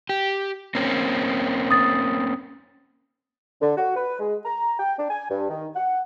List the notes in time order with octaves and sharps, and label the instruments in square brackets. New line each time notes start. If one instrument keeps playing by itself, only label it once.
[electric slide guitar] G4
A#3 C4 C#4
[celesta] D#6 A6
[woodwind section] D3
F#4
B4
G#3
A#5
G5
D4
G#5
G2
D#3
F#5